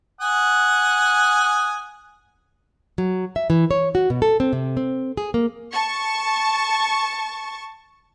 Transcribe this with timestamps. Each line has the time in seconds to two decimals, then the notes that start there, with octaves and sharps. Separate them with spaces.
0.21 F#5 G#5 D#6
2.98 F#3
3.36 E5
3.50 E3
3.71 C#5
3.95 F#4
4.10 B2
4.22 A4
4.40 C4
4.53 C3
4.77 C4
5.17 G#4
5.34 A#3
5.72 A5 C#6